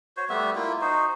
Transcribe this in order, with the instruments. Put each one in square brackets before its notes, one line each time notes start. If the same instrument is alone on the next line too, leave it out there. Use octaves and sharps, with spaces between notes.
[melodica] F#4 C5 C#5
G3 A3 B3 E5
A#3 E4 F4
D#4 F#4 C5